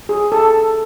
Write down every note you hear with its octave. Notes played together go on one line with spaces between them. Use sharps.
G#4
A4